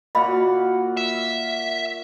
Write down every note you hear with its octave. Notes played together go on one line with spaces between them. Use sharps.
A#2 F#4 D#5 F5 F#5 B5
E5